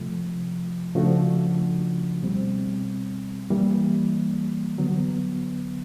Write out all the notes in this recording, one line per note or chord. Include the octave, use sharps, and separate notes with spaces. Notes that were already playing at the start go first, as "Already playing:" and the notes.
Already playing: C3 F3 A3
C#3 F3 A3 D4 F#4
B2 G3 C4
E3 G3 A#3
D3 F#3 B3